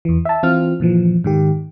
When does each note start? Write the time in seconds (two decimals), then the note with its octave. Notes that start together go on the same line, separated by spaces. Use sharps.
0.05 E2 E3
0.25 E5 A5
0.43 E3 C4 F4 F6
0.80 G2 A#2 E3 F3
1.24 G#2 D#3 G4